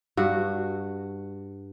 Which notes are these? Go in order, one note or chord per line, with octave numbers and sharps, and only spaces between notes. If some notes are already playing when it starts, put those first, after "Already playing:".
G2 F#4